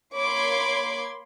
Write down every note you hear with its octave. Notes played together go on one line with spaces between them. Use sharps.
A#3 C#5 B5 C6 D6 G#6